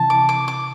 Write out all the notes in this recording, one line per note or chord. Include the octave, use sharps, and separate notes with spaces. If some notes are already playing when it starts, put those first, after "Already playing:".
Already playing: C3 E3 A5
D6
D6
D6